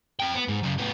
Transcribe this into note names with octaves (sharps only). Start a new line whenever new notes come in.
F4 G5
B3
G#2
F#2 C#3
A2 B3